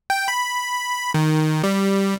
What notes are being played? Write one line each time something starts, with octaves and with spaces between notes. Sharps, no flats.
G5
B5
D#3
G3